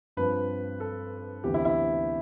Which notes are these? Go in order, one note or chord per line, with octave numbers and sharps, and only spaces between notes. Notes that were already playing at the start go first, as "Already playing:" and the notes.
G2 F3 C4 B4
A4
D2 C3 E3 B3 G4
E4
E4